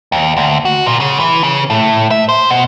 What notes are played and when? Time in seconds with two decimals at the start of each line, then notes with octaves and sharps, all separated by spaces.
0.12 D#2
0.37 D2
0.65 F#4
0.86 A#2
1.00 C#3
1.20 E3
1.44 C#3
1.70 A2
2.11 E5
2.29 C5
2.50 B2